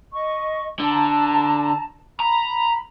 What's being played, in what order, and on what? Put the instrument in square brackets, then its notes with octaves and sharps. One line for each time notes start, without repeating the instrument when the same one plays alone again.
[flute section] D#5 C#6
[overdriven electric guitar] D3 [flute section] A5 A#5
[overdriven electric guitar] A#5 [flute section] B5